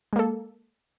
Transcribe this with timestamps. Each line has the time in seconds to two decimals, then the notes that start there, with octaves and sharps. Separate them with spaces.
0.13 G#3
0.16 A#3
0.19 A4